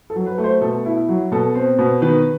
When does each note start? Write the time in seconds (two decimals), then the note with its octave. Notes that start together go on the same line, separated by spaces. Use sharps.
0.10 A4
0.16 F#3
0.26 B4
0.38 A3
0.44 C5
0.61 B2 A4
0.85 E4
1.09 F#3
1.32 B2 A4
1.55 C4
1.78 B2
2.02 D#3 B4